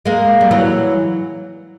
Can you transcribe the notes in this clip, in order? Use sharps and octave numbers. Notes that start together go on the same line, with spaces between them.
G#3 A#3
G3
E3 F#3